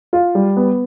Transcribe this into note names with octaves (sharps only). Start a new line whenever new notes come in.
F4
G3
B3